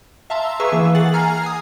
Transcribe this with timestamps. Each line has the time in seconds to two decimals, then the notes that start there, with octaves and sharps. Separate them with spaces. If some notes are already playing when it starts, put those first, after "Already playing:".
0.30 E5 F5 A5 A#5 C6 E6
0.60 G#4 B4 E5 C#6 E6
0.72 E3 A#3 E5
0.95 G#4 F#5 A6 F#7
1.14 G#5 A#5 F6 G#6 C7
1.43 G#5 D#6